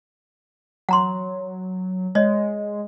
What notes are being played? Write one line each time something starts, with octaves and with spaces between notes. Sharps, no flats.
F#3 F#5 A#5 C6
G#3 C#5 D#5